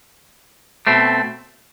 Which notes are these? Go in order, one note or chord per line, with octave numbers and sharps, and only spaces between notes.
B2 A3 C4